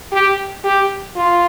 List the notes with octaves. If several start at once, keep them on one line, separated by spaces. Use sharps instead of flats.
G4
G4
F4